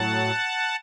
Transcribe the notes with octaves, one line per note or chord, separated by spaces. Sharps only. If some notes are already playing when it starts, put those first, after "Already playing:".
Already playing: A2 F#3 F#5 A5